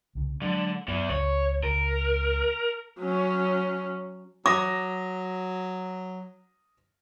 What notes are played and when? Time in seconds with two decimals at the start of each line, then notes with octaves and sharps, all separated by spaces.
0.15 C2 C#3
0.41 D3 F#3 G#3
0.88 F#2 E3 B3
1.09 C#2 C#5
1.63 C#2 A#4
3.00 F#3 C#4
4.46 F#3 D6 D#6 A#6